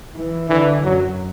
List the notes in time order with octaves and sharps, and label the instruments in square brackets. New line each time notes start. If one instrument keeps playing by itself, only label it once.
[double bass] E3
[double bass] D3 [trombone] E3
[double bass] F#2 [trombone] F#3